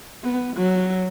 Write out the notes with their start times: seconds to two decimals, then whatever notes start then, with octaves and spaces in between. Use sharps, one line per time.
0.24 B3
0.57 F#3